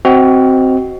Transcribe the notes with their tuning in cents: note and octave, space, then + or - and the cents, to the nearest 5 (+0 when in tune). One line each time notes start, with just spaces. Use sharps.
C4 +0 F#4 +20 D#5 +5